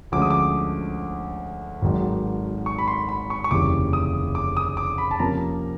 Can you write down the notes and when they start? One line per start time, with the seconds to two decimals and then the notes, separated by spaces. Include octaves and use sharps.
0.12 D2 D3 F3 G#3 C#4 D6
0.22 D#6
0.30 D6
1.82 G#1 G#2 D#3 F#3
2.66 C#6
2.78 B5
2.88 C6
3.09 B5
3.30 C#6
3.44 C#6
3.51 F1 D#2 C#3 E3 G3 D6
3.93 D#6
4.35 D6
4.57 D#6
4.77 D6
4.98 B5
5.11 A5
5.19 F2 C3 F3 A#3 C#4 A#5